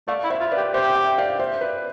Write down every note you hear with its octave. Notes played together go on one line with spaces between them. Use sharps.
A3 D5 F5
E4
C5 E5
F4
B4 D5
G4
G4 C5 E5
E5 G5
D5 F5
C5 E5
B4 D5